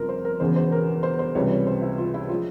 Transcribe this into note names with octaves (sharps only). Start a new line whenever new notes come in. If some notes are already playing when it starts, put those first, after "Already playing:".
Already playing: G1 F2 C#3 A#4
C5
A#4
E1 E2 C#3 E3 C5
C5
A#4
C5
C5
C#2 C3 E3 G3 C#5
C#5
C5
E4
F4
E4
F4
F3 G#3